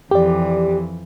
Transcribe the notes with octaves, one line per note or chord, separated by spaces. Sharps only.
F2 E3 G4 D5